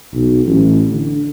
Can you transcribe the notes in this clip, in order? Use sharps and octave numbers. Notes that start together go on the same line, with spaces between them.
B1
A1
D3